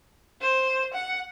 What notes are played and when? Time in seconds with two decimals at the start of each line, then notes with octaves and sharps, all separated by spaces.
0.42 C5
0.94 F#5